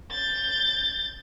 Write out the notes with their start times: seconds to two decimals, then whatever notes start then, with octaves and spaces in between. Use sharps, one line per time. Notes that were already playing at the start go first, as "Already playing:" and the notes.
0.11 G6 A6